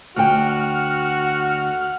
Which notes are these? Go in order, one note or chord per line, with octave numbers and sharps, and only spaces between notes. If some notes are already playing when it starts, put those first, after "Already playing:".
D2 F#4 F#5 G5 F6